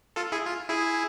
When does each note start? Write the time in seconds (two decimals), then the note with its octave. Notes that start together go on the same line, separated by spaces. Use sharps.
0.16 F4 A4
0.32 E4 G#4
0.46 F4
0.69 E4 G#4